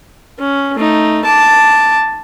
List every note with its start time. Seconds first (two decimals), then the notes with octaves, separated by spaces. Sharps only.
0.39 C#4
0.75 A3 D#4
1.24 A5 D6